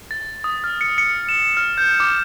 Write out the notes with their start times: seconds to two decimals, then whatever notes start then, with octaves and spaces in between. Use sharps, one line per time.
0.11 A6
0.44 D#6
0.64 F6
0.81 C#7
0.98 C#7
1.29 E7
1.57 F6
1.78 G6
2.00 D6